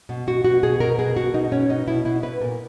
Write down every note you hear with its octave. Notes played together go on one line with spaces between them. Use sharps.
B2
B2 F#4
B2 F#4
B2 G#4
B2 A#4
B2 G#4
B2 F#4
B2 D#4
B2 C#4
B2 D#4
B2 E4
B2 E4
B2 B4
A#2 A#4